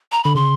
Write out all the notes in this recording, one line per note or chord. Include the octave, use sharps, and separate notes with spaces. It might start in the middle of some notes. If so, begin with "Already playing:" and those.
A#5
D3 B5
C#3 C6